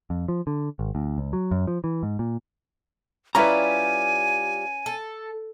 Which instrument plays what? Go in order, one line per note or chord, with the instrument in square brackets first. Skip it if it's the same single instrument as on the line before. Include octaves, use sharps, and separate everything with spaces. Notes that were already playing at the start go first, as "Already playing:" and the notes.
[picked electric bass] F2
F3
D3
G#1
D2
C#2
F#3
F#2
F3
E3
G#2
A#2
[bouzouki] G3 F4 G4 [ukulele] C#4 E4 B4 [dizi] G#5 [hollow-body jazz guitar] A#5
[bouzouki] A4